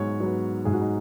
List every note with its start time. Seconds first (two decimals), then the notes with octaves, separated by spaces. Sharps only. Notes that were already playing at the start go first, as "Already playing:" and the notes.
Already playing: G#2 F#3 B3 G#4 C#5
0.20 F#3 B3
0.65 G#2 G#4
0.74 F#4
0.81 D#4